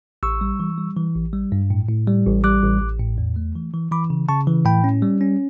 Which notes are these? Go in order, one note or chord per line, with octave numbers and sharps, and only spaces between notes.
A1 C#6 E6
G3
E3
G3
E3
A1
G3
G2
A2
A2
G3
A1
G3 D6 F#6
A1
A1
A2
E2
A3
E3
E3
E3 B5 D6
C#3
C#3 A5 C#6
E3
A2 G5 B5
C#4
G3
C#4